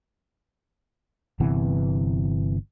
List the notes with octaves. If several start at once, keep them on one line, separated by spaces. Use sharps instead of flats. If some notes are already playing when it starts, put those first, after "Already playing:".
G1 C3 E3 B3